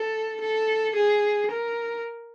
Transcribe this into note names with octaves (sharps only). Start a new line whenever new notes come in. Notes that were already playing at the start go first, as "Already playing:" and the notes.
Already playing: A4
A4
G#4
A#4